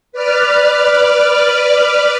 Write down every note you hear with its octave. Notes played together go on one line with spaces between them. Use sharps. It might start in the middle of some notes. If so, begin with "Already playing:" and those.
B4 D5 F6